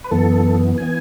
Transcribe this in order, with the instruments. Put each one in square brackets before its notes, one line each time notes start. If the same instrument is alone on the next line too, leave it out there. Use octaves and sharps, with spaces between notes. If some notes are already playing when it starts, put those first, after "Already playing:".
[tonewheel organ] B4
F#2 E3 B3 A4
E3 B3 G#5